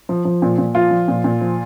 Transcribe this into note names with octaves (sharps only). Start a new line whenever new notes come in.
F3
F3
A#2
A#2
F3 F4
F3
A#2
A#2
F3